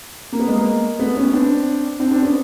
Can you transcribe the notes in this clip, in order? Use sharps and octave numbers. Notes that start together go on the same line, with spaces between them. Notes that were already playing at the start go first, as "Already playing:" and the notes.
A#3
B3
G#3 A#3
A3 B3
B3 C#4
C4 D4
C4 D4
C4 D4
B3 C#4